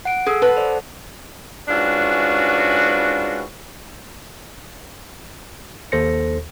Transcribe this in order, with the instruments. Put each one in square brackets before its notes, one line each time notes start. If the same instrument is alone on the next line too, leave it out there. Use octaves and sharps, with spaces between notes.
[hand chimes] F#5 D7
[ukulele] G#4 [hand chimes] A4 E6
[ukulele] B4 [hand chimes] F#5 A5
[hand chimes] A4 C5 D5
[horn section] G#2 C#4 D4 F4 F#4 B4
[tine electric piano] D#2 A4 C5 A#6 C#7